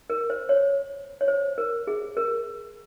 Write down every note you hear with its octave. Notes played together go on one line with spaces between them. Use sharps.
A#4
C5
C#5
C#5
C5
A#4
G#4
A#4